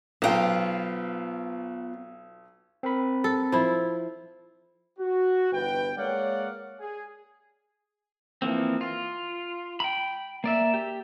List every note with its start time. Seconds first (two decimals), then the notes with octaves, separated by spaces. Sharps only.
0.22 B1 B3 F4 C5 G5
2.83 C4 A#4 B5
3.24 A4
3.52 F3 E4
4.99 F#4
5.52 G1 E3 B4 G5
5.97 G#3 A#3 C#5 D5 F5 F#5
6.80 G#4
8.42 E3 F3 A#3 C4
8.81 F4
9.80 G5 B5
10.44 A#3 D5 E5
10.74 G4